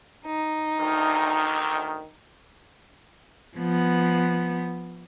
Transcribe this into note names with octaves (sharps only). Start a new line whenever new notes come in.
D#4
D2 D#3
F3 B3